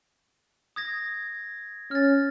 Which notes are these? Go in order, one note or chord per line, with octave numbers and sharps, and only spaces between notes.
D#6 G#6 A#6
C#4 F6 A6